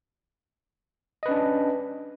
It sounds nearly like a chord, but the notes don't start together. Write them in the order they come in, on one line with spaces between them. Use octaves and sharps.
D#5 B4 C#4 D4